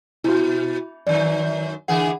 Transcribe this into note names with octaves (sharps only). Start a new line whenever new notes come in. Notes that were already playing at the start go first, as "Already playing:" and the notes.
B2 E4 F#4
F#2 D#3 D5
D3 E3 G#4 F#5